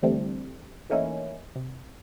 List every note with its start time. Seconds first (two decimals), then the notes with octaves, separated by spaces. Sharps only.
0.02 D2 D3 E3 G3 A3 C4
0.90 E3 A3 A#3 C#4 D#4 E4
1.56 C3